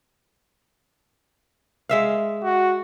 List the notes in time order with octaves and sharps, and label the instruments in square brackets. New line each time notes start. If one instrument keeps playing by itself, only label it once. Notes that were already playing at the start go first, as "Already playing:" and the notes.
[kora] G#3 E5 F5
[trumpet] F#4